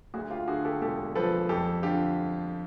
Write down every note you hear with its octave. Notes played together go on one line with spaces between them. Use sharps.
D2 F#4 G#4
F4 G4
D3 F#4 G#4
G4 A4
E1 G4 A4
F3 A4 B4
F2 G4 A4
D3 F4 G4